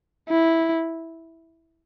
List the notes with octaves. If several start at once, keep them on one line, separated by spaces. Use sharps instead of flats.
E4